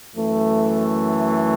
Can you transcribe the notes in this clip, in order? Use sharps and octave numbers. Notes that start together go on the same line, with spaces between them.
F#2 E3 A3